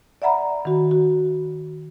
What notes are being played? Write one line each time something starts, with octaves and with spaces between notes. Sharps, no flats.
D5 E5 F#5 A#5 B5
D#3 F#4
F#4